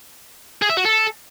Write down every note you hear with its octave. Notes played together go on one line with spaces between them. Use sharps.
G#4
E5
F#4
A4